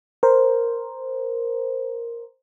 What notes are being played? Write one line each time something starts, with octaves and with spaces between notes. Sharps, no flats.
A#4 C5